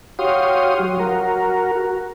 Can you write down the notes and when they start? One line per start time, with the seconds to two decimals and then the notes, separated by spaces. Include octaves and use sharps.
0.19 F#4 G4 C#5 F5 C6 D#6
0.80 F#3
1.00 F#4 A#4